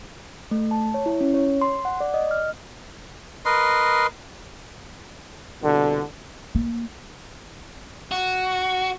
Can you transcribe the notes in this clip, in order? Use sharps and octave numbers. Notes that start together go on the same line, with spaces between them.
A3
A5
C#5
E4
C#4
C#5
C6
F#5
D5
D#5
F6
A#4 B4 D#5 C6
C2 B2 D3
A#3
F#4